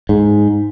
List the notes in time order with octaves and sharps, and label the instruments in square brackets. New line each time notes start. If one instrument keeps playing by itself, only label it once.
[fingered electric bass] G#2